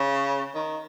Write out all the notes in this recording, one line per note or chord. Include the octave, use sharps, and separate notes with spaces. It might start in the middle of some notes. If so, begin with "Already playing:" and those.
Already playing: C#3
D#3